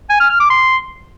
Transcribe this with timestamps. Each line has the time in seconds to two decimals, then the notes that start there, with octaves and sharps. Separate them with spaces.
0.10 G#5
0.20 F6
0.30 F6
0.40 D6
0.50 C6